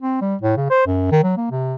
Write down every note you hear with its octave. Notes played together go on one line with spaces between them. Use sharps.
C4
G3
A2
C#3
C5
F#2
D#3
F#3
A#3
C3